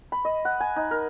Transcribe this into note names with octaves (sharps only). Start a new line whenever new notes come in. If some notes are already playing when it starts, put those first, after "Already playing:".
B5
D#5
F#5
G#5
D#4
A#4